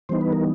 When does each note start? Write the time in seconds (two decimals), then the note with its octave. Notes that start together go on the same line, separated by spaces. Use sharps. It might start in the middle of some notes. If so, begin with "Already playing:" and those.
0.09 E3 G3 B3 D#4 C5
0.21 B4
0.33 A#4